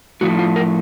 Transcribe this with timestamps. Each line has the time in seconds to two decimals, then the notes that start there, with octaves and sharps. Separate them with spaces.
0.21 A2 F3 A3 F#4
0.39 F4
0.56 A#4